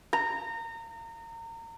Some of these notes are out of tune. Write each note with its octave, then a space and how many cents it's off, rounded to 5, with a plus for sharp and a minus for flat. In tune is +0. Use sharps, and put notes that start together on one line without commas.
A#5 -30